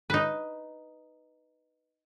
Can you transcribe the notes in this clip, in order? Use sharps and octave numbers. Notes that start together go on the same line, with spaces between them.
D#4 B4